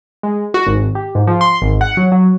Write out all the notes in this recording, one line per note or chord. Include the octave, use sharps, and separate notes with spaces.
G#3
F#4
G#1
G4
G#2
F3
C6
G#1
F#5
F#3
F#3